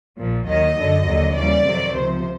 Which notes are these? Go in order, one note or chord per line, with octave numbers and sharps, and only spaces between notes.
A#1 A#2 F3
D#2 D#3 F#3 D#5
F#2 D3 F#3
D#2 D3 F#3
D#2 C#3 E3 G3 D5
F2 C3 D#3 F#3
C#2 C3 F3 C5